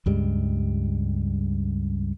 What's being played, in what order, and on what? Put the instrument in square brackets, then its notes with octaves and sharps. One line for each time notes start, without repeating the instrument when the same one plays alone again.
[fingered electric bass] C#2 G2 G3 G#3